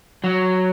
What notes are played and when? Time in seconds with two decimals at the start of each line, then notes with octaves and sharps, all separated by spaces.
0.24 F#3